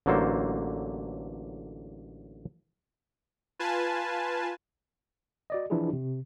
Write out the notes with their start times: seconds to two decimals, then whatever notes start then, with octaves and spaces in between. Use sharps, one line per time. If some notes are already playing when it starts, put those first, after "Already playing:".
0.06 A1 D3 F#3 A#3 A4 C5
3.59 F4 B4 G#5 A5
5.50 F#4 D5 D#5
5.70 E3 F3 D4 E4 F4 G#4
5.93 C3